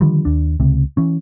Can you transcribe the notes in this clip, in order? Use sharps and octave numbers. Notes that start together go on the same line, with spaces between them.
D3 D#3 F3 G3
D#2 D4
C#2 C3
E3 C#4